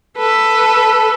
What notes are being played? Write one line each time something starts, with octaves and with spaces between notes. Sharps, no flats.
A4 B4